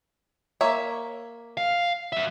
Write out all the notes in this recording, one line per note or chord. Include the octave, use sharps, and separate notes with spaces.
A#3 C#5 E5
F5
F#3 E5